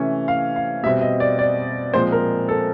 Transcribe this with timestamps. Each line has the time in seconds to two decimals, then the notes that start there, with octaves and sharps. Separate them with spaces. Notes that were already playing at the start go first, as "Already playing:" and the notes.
Already playing: C3 E3 A3 C#4
0.28 F5
0.56 F5
0.83 B2 G3 C4 E5
1.01 D#5
1.20 D5
1.39 D5
1.94 A#2 F3 G#3 C4 C5
2.12 A#4
2.49 A4